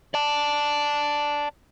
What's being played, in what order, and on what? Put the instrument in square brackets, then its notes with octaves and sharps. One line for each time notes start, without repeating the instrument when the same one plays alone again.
[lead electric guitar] D5 A5